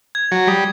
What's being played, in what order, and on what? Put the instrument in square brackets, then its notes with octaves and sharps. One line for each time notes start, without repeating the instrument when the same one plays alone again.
[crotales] G#6
[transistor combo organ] F#3
[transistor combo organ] G3 [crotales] D#6